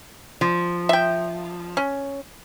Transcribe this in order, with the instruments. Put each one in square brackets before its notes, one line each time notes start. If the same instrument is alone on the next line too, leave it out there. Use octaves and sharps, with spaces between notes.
[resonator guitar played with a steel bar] F3
[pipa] E5 G5
C#4